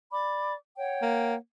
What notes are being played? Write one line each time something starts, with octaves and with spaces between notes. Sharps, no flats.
D5 B5 D6
C#5 F#5 G5
A#3